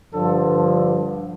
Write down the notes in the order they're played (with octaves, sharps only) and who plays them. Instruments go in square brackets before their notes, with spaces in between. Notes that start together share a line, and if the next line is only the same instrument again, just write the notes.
[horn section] G2 D3 F3 A4